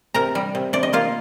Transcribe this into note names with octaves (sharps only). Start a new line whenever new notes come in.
C3 A#4 A#5
G3
C3
C3 D5
D#5
A#3 F4 F5